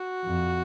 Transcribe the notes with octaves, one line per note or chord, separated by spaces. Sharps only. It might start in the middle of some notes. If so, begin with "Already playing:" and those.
Already playing: F#4
F2